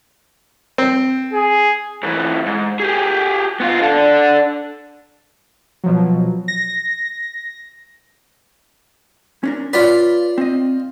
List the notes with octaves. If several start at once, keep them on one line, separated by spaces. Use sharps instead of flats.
C4
G#4
G#2 E3
G#2
G4 G#4
B3 F4
D4 A4
B2 F3 F#3
A#6
C#4 D4 A#4
F4 B4 C#5 D5 F5
C4 D#5